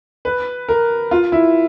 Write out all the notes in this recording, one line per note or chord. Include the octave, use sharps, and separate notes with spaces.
B4
A#4
F4
E4